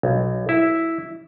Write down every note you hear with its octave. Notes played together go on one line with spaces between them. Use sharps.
B1
E4